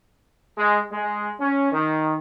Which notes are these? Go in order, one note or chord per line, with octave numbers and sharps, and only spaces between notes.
G#3
G#3
C#4
D#3